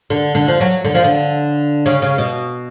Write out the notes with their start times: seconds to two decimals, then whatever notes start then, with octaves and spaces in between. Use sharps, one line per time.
0.10 D3
0.35 D3
0.48 F3
0.61 F#3
0.85 D3
0.95 F3
1.04 D3
1.86 C#3
2.02 C#3
2.18 B2